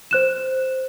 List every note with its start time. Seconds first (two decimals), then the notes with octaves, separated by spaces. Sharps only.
0.11 C5 F#6 E7